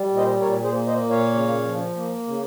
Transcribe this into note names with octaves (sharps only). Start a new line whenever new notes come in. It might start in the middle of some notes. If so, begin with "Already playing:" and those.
Already playing: G3
A#2
C5 D#5
A#2 A#4 C#5
G#4 C5
A#3
C5 D#5
A#2
C#5 F5
C#3
F3
A#3
C#3